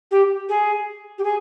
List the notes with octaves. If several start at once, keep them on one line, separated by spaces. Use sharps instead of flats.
G4
G#4
G4
G#4